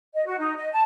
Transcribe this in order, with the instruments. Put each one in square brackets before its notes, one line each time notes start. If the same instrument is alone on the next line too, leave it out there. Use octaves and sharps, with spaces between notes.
[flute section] D#5
F#4
D#4
D#5
A5